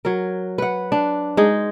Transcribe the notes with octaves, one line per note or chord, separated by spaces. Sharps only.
F#3 A#4
B4 F#5
D4
G#3 D#4